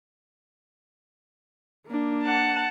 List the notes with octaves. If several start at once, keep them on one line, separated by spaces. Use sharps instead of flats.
A#3 D4
F#5 A5